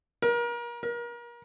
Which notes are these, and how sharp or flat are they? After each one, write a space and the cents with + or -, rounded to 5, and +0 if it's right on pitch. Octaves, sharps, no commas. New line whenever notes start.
A#4 +35
A#4 +35